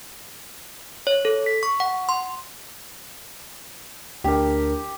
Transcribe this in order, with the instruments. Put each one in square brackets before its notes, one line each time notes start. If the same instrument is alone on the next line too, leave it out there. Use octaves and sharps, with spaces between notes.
[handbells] C#5
A4
B6
C#6
F#5
C6
[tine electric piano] D2 D4 A#4 [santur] G4